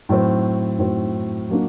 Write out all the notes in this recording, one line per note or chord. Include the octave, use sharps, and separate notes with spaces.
A2 F#3 C4
A2 F#3 C4
F#3 A#3 D4 F#4